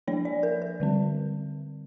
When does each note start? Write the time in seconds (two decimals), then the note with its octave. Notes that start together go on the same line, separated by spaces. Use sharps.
0.08 F3 A#3 D4 C#5
0.25 D5
0.43 A#4
0.62 A#4
0.80 D3 G3 C4